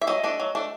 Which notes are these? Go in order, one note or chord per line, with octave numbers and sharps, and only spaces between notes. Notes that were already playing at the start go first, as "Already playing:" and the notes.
E5
F#3 D#5
A3 D4
F#3
A3 D4